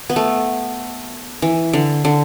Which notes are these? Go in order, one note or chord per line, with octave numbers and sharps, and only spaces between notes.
B3
A3
E3
D3
D3